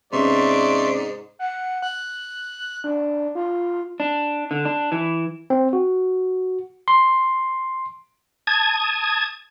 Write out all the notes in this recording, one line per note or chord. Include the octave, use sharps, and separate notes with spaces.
G#2 C3 B3 C#4 D5 E5 C6 C#6
F#5
F#6
D4
F4
D4
D3
D4
E3
C4
F#4
C6
A5 D#6 G#6